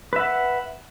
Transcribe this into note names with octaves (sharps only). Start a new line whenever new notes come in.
B4 E5 F#5